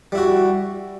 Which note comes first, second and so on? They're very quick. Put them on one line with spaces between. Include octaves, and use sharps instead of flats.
G3 E4 F#4